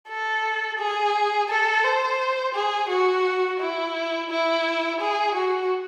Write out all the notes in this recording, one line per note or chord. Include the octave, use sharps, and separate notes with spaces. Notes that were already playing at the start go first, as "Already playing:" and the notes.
A4
G#4
A4
C5
G#4
F#4
E4
E4
G#4
F#4